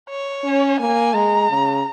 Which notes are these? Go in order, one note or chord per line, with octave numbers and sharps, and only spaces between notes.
C#5
C#4
A#3 G#5
G#3 A#5
C#3